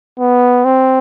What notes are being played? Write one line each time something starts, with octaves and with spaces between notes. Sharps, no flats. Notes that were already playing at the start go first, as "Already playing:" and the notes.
B3
C4